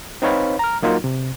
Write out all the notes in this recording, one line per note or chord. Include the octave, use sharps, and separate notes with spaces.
C4 D#4 B4 C#5 F5 B5
A#5 F6
F#3 A#3 D#4 F4 F#4
C3